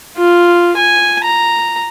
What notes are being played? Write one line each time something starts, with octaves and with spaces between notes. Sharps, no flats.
F4
G#5
A#5